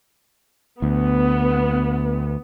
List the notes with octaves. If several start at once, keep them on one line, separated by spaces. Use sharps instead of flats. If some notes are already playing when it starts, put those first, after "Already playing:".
D2 B3